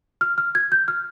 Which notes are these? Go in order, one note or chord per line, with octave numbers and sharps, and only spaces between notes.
F6
F6
G#6
G6
F6